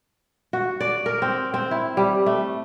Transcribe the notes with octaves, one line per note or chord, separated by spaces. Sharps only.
F#4
D5
A#4
C4
C4
E4
G3
A3